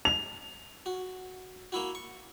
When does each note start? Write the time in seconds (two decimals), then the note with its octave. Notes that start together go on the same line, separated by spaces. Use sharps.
0.05 F7
0.86 F#4
1.72 A#3 E4 F#4
1.95 C#6